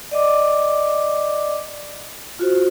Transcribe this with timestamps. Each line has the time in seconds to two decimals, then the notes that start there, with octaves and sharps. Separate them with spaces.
0.11 D5 D#5 D6
2.39 F4 F#4 C5